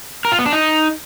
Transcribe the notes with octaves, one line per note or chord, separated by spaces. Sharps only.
A#4
F4
B3
D4
D#4